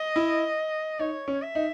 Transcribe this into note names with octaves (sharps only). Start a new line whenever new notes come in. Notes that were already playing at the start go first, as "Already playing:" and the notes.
Already playing: D#5
E4
D#4 C#5
C#4
E5
D#4